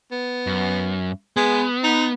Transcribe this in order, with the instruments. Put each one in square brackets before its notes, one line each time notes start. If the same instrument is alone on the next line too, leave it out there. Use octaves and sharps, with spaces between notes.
[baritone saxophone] B3
[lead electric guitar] F#2
[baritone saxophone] G#3 [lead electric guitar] B3
[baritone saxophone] D#4